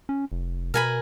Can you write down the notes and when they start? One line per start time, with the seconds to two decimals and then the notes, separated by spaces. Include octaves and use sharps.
0.09 C#4
0.32 F1
0.74 B2 A#4 G#5 B5